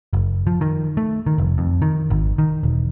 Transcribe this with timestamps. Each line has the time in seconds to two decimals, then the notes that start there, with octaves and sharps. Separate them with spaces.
0.13 F#1
0.47 F3
0.61 D#3
0.97 A3
1.27 D#3
1.38 F1
1.58 F2
1.82 D#3
2.10 G#1
2.38 D#3
2.63 E1